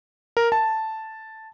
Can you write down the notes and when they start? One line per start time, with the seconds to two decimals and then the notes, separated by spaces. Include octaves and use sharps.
0.37 A#4
0.52 A5